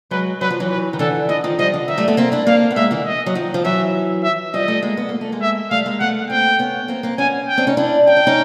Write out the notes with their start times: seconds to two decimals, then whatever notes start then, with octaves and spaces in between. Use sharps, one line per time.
0.11 F#3 G#3 B4
0.41 F#3 B4
0.51 F3
0.60 E3 F#3
0.70 B4
0.93 D#3
0.99 D3 E3 A4
1.29 D3 E3 D#5
1.44 D#3 F3
1.59 F3 G3 D#5
1.74 D3
1.88 D#3 E5
1.98 G3 A3
2.08 A3 B3
2.17 A#3 C4
2.32 D4 E4
2.47 A#3 C4 F5
2.71 B3
2.76 G#3 A#3 E5
2.91 D3 E3
3.06 D#5
3.26 F#3
3.35 D#3 F3
3.54 F3
3.65 E3 F#3 E5
4.24 E5
4.53 F3 G3 D#5
4.68 G3 A3
4.83 G#3 A#3
4.97 B3
5.09 A#3
5.21 A3
5.32 G#3 A#3
5.42 E5
5.71 G3 A3 F5
5.86 G#3 A#3
6.00 A3 B3 F#5
6.30 A#3 C4 G5
6.59 B3 C#4
6.88 A#3 C4
7.03 A#3 C4
7.18 B3 C#4 G#5
7.48 G5
7.58 C4 D4
7.67 C#4 D#4
7.77 D4 E4
8.07 D#4 G5
8.17 D4
8.27 C#4 D#4